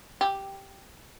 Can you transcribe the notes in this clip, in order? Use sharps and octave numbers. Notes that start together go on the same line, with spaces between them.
G4